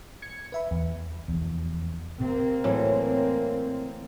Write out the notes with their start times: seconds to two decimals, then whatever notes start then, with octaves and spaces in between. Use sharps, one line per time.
0.22 G#6 C#7
0.52 B4 E5 B5
0.71 E2
1.28 F1 E2
2.20 C3 A#3 C4
2.64 A2 E3 F#3